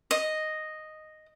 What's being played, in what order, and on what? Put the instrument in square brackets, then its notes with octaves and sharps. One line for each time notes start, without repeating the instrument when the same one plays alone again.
[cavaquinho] D#5